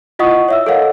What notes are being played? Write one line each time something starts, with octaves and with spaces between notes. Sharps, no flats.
E4 F4 D#5 F#5 C#6 D#6
C#5 E5 E6
A4 A#4 C#5 D#5 F5 F#5